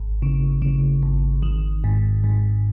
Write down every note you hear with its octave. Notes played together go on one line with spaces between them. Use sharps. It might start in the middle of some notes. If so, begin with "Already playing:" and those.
Already playing: G#1
C#3
C#3
G#1
D#3
G#2
G#2